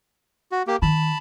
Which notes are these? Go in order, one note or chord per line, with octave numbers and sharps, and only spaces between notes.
F#4
A#3 G4
D#3 A5 B5